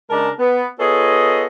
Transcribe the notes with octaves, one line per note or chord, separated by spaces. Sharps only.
C#3 G#3 D4 A#4 A5 A#5
B3
B3 F4 G#4 A4 C#5 D#5